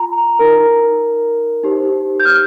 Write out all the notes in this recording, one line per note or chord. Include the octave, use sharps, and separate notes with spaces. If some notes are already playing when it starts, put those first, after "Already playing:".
Already playing: F4 A#5
D#4 A#4
D#4 G4 C5
G6
F6